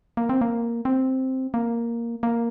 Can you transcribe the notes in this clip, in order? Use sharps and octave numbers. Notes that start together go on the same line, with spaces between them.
A#3
C4
A#3
C4
A#3
A#3